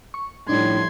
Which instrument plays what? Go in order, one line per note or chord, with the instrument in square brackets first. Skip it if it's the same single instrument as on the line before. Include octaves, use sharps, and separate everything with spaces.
[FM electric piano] C#6
[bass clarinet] A2 [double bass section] F3 G3 A3 [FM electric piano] D4 D#4 [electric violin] C6 G#6